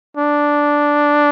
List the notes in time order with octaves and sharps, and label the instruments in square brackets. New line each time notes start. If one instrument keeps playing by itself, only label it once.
[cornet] D4